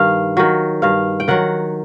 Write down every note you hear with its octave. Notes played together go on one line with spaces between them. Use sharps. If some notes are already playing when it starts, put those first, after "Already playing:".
Already playing: G2 D#3 F5
D#3 F#3
G2 F5
G5
D#3 F#3 F#5